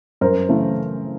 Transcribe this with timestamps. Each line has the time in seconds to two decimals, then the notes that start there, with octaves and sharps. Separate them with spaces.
0.21 F#2 A#4 C5
0.49 C#3 E3 A3